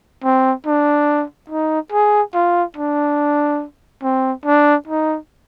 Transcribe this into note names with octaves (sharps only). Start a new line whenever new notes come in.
C4
D4
D#4
G#4
F4
D4
C4
D4
D#4